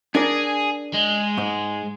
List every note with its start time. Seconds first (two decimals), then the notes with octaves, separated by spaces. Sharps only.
0.15 D4 G#4 A#4 D5
0.93 G#3
1.38 G#2